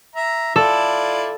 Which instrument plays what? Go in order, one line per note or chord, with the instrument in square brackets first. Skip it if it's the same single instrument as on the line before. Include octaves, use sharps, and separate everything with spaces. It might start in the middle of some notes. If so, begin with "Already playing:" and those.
[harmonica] E5 A#5
[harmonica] E4 F4 D5 [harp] A4